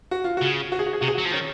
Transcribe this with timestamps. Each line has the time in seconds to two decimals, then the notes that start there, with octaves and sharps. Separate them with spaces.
0.11 F#4
0.24 F4
0.37 C#3 F#4
0.72 F#4
0.79 G#4
0.86 F#4
0.93 G#4
1.01 C3 F#4
1.08 G#4
1.15 F#4
1.18 F#3
1.25 F3
1.32 D#3 C#4